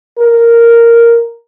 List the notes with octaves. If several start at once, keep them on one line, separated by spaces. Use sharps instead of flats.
A#4